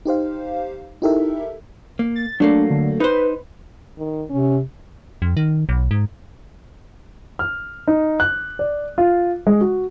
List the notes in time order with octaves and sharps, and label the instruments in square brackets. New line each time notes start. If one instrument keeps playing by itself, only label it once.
[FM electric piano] D#4 G4 C5 F5
D#4 E4 G4 A4 A#4 E5
[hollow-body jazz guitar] A#3
[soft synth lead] A6
[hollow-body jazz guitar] F#3 A3 A#3 [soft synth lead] D4
[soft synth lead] D3
[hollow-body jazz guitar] D#4 C5 [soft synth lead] B4
[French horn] D#3
[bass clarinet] C3 [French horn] C#4
[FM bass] F2
D#3
B1
G#2
[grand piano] F6
D#4
F#6
D5
F4
G#3
F#4